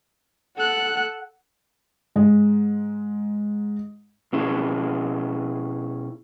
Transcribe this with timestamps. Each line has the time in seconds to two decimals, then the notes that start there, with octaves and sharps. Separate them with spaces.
0.58 A4 F#5 F#6
2.16 G#2 G#3
4.33 B2 C#4 E4 G#4